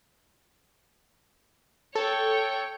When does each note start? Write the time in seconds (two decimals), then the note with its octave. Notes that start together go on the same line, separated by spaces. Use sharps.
1.95 A4 C#5 G5